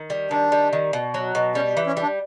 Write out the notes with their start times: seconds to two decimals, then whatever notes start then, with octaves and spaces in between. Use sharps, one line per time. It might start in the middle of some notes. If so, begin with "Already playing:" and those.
Already playing: D#3
0.10 G3
0.31 D#3 D4
0.52 G3
0.73 D#3
0.93 B2
1.14 F#3
1.35 B2
1.55 G3 C#4
1.77 E3
1.87 C#4
1.97 G3
2.02 D4